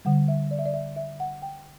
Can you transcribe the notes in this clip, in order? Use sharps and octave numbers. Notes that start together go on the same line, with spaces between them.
D3 G3 F#5
E5
D5
E5
D5
E5
E5
F#5
G5